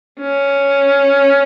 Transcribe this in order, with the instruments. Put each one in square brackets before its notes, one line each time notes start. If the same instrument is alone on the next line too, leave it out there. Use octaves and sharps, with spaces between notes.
[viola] C#4